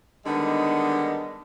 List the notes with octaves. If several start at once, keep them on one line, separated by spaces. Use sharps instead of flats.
D3 D#3 G3 G#3 B3 D#4